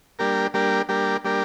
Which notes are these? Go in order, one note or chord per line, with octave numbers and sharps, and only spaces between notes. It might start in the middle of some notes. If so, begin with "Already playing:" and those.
G3 A#3 D4 G4 A#4
G3 A#3 D4 G4 A#4
G3 A#3 D4 G4 A#4
G3 A#3 D4 G4 A#4